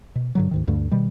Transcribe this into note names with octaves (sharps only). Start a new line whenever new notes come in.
B2
G2 D3 F#3
D2 G#2 D#3
D2 G2 D3 A3
B2 D#3 G3